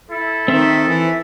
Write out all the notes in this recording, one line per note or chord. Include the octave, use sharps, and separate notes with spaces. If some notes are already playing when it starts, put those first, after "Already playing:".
E4 A4
D#3 C4 E5
E3 E5